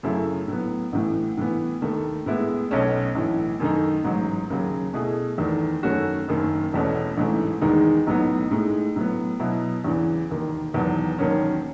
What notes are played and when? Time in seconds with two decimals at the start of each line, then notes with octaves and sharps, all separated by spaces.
0.03 F#2 C#3 F#3 A3 E4
0.48 A2 F#3 B3
0.92 A1 A2 E3
1.37 A2 E3 B3
1.82 D#2 D#3 A3
2.26 A2 G#3 B3 E4
2.71 B1 B2 A3 C#4
3.15 B1 A2 E3
3.60 F#2 D#3 A3 D#4
4.04 A1 G#2 F#3
4.50 D#2 C#3 F#3
4.93 B2 A3 E4 G#4
5.38 E2 D#3 A3
5.83 F#2 D#3 A3 C#4 F#4
6.28 F#1 F#2 D#3
6.72 E1 E2 B2 A3 C#4
7.17 A1 G#2 E3 A3
7.61 E2 D#3 G#3 D#4
8.07 B1 A2 F#3 B3 D#4
8.51 A2 G#3 D#4
8.96 A2 F#3 B3
9.39 B2 F#3 B3 E4
9.84 E2 C#3 E3
10.29 E1 D#2 D#3
10.74 E1 E2 D#3 F#3 B3
11.18 E1 D#2 D#3 F#3 C#4